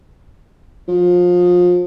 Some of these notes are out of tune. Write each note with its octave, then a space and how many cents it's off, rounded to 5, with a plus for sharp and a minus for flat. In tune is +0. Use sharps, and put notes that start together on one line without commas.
F3 +25